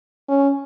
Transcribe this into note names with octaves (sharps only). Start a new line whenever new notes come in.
C#4